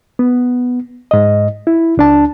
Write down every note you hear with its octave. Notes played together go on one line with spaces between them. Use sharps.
B3
G#2 D#5
E4
C#2 D4 A5